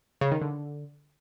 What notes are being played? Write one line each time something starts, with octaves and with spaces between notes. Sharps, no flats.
C#3
D#3
D3